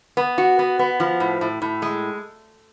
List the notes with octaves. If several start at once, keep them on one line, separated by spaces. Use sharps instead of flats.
B3
F#4
B3
B3
F3
A2
A2
A2
G#3